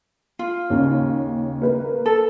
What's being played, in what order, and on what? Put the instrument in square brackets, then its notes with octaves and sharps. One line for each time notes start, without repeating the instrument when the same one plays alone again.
[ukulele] F4
[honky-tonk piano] D#2 C#3
A#3 B4
[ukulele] A4